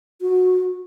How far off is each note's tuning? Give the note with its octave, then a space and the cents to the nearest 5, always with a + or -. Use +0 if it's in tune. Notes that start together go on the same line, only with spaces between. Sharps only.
F#4 -15